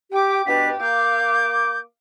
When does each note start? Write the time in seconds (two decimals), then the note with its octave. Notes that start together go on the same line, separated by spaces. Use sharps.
0.11 G4 G5 D6
0.46 B2 D4 G4 B4 B6
0.80 A#3 F5 D6 G6